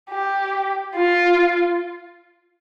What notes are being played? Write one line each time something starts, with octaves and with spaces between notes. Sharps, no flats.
G4
F4